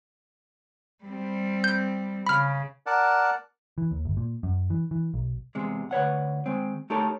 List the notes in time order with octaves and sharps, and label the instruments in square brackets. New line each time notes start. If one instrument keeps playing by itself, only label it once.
[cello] G3 C4
[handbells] G6
[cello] C#3 [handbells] B5 F6
[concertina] A#4 D5 F#5 A5
[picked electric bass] E3
D#2
G1
A#2
F#2
E3
E3
B1
[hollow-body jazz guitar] E2 C3 G#3
D2 B4 C#5 F#5
D#3 G#3 C4
A3 D#4 G4 A4 A#4 C#5